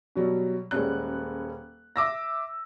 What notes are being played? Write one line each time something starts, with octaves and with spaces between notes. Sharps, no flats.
B2 F#3 G3
D#1 G3 G#3 C#4 F#6
E5 D6 E6 A#6